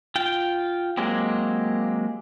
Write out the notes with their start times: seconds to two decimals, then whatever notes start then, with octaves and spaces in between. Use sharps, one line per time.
0.16 F4 G5
0.97 F#3 G#3 A#3 C4 G4